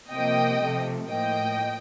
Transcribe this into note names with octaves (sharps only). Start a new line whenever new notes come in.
C3 F3 A#3 D#5 G5
C3 F3 A3
A2 F3 A#3 D#5 G5